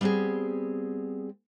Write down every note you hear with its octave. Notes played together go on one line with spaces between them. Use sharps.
G3 B3 C4 G4 G#4